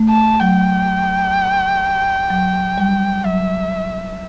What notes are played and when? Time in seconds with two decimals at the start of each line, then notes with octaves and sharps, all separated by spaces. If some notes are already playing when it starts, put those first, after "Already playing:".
Already playing: A3
0.10 A5
0.41 F#3 G5
2.30 F#3
2.78 G3
3.24 F#3 E5